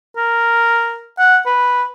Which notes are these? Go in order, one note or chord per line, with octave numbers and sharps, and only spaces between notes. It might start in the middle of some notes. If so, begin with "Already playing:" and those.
A#4
F#5
B4